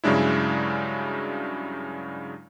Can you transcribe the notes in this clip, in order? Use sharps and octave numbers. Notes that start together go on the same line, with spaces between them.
G2 C#3 F#3 G#3 D4 E4